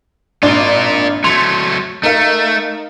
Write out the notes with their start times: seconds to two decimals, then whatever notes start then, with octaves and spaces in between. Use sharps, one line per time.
0.43 G#1 D4 F4 A#4 A6
1.24 F#3 A3 C6 G#6 F7
2.03 A3 D#4 A#4 F5